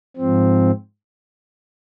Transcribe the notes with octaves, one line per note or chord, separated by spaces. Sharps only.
G#2 F3 C4